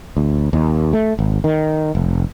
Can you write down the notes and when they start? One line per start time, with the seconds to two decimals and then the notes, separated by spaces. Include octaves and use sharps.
0.17 D2
0.53 D#2
0.93 A3
1.19 G#1
1.44 D#3
1.95 F1